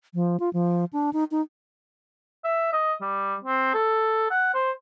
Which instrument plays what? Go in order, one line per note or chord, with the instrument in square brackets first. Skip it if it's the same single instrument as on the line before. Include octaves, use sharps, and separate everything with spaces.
[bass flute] F3
F4
F3
D4
D#4
D#4
[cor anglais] E5
D#5
G3
C4
A4
F#5
C5